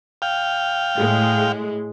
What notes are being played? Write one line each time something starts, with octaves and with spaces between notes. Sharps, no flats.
F5 G5
A2 G#3